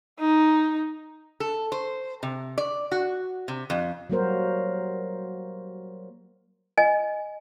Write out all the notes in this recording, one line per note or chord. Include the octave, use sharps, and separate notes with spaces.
D#4
A4
C5
C3
D5
F#4
C3
F2
F#3 G3 A#3 F#4 A#4 C5
D#5 G#5